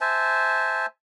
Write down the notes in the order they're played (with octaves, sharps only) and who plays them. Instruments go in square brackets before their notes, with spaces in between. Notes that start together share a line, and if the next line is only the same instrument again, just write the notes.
[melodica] C5 E5 G#5 A5